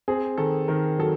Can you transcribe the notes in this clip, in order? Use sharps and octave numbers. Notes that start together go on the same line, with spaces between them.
C4 G#4
D#3 A4
D#3 A#4
F#3 A4